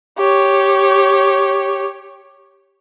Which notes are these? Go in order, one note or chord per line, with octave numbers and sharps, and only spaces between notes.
G4 C#5